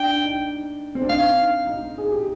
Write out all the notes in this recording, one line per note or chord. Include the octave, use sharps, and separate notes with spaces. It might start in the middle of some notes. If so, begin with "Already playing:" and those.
Already playing: D4 G5
D#4
C4
D4
D#4 F5
D#4
G#4
G4